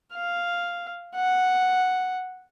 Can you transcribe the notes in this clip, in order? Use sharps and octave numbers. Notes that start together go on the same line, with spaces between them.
F5
F#5